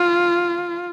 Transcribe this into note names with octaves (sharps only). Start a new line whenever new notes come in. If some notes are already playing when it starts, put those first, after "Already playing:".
Already playing: F4